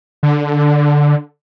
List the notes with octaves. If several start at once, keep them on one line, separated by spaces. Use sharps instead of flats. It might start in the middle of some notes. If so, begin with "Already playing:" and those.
D3